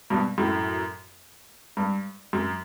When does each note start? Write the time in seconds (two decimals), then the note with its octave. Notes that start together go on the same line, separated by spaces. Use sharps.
0.10 G2 B2
0.38 F#2 A2
1.77 G2
2.33 F#2